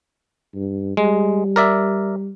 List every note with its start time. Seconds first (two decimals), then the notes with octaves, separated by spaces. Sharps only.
0.55 G2
0.97 G3 G#3
1.56 A#4 D5 E5